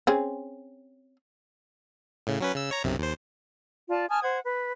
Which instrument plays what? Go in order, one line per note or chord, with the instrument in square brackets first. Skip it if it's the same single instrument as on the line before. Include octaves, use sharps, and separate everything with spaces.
[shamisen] C4 C#4 G#4
[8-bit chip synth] A2 C#3
F#3 C#4 B4
C#3 E6
C#5 A#5
B1 F#2 C3
D#2 C5
[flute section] F4 D5 A5
G#5 A5 D#6 F6
C5 F#5 G#6
B4